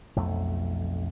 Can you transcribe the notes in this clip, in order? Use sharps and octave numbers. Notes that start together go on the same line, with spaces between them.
B1 F2 A3